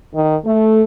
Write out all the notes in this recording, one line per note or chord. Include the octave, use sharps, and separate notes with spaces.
D#3
A3